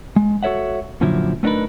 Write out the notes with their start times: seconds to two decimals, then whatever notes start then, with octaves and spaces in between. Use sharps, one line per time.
0.16 G#3
0.43 F#4 A4 C#5 E5 F#5
1.01 F#2 A#2 D3 F3 F#3 E4
1.43 A3 B3 D4 D#4 A#4 B4